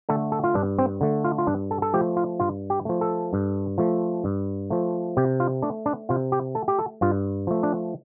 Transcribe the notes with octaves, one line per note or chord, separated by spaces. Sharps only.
D3 A3 A4
A4
F4
G2 D4
C4
D3 A3
F4
F4
G2 D4
A4
A4
F3 A3 G4
F4
G2 F4
G4
F3 A3
A4
G2
F3 A3
G2
F3 A3
C3 G4
F4
A3 D4
D4
C3 F4
G4
A3 A4
G4
A4
G2 F4
F3 A3
D4